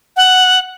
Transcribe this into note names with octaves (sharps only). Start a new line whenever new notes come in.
F#5